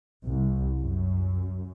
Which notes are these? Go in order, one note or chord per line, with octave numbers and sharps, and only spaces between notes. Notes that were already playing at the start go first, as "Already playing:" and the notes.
C2
F#2